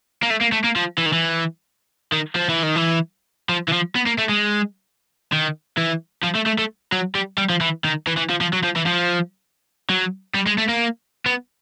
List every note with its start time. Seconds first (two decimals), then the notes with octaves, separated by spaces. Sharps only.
0.23 A#3
0.30 A3
0.41 A#3
0.52 A3
0.64 A#3
0.76 F3
0.98 E3
1.06 D#3
1.13 E3
2.13 D#3
2.36 F3
2.50 E3
2.63 D#3
2.76 E3
3.49 F3
3.68 E3
3.72 F3
3.95 B3
4.06 A#3
4.18 A3
4.29 G#3
5.32 D#3
5.78 E3
6.24 F3
6.36 A3
6.47 A3
6.59 A3
6.92 F#3
7.15 G3
7.38 G3
7.50 F3
7.61 E3
7.84 D#3
8.07 E3
8.18 E3
8.30 F3
8.41 F3
8.53 F#3
8.64 F3
8.76 E3
8.86 F3
9.90 F#3
10.35 G3
10.47 G#3
10.58 A3
10.69 A#3
11.26 B3